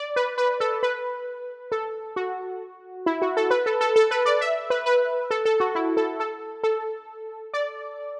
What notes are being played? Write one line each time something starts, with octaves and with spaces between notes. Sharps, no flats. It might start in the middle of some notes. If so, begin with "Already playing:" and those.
Already playing: D5
B4
B4
A4
B4
A4
F#4
E4
F#4
A4
B4
A4
A4
A4
B4
D5
E5
B4
B4
A4
A4
F#4
E4
A4
A4
A4
D5